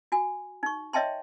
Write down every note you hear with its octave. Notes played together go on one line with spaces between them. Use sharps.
F#4 G#5
D#4 C#6
C#5 D#5 E5 G5 A5 C6